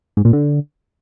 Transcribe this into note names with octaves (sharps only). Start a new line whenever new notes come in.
G#2
A#2
D3